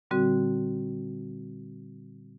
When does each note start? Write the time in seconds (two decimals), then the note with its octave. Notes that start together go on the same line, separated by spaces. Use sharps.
0.11 A#2 D3 G3 C4 F#4